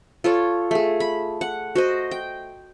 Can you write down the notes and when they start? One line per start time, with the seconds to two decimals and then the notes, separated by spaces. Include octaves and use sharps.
0.24 F4 A4 C#5
0.71 A3 G#4
1.00 B5
1.41 F#5
1.75 F#4 C5 D#5
2.11 G5